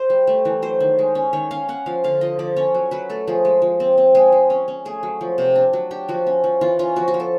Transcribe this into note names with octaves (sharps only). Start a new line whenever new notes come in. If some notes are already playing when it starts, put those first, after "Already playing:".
Already playing: C5
G3
A3
E3
F#3 C5
D#3
G#3
C#4
D#3 C#5
C#4 F5
C#4 F#5
F3 F5
D3 F5
F3 D#5
F3 D5
C#4 C#5
F#3
F#3 B4
A3 A4
F3 G#4
G#3
F3
C4
C4
G#3 G#4
G#3
C#4
C#4
A3 G#4
F#3
F3
C3
D4
F#3
D4 G4
F3 F#4
C#4
F3
E3 F4
C#4 F4
F3 F#4
F#4
F3
A4